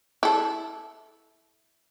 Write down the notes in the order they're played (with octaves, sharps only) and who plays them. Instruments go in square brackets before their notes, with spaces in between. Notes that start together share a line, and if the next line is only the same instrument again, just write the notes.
[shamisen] E4 A4